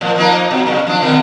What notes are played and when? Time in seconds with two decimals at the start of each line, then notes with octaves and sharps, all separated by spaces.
0.01 A2 F3
0.16 F3 A#3 D#4
0.51 B2 F#3
0.66 F#2 C#3
0.87 F3 D4
1.01 B2 D3 D#3